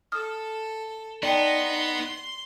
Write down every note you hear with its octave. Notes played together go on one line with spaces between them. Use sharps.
A4 D#6 F6
B3 D#4 D5 G5 A5 C6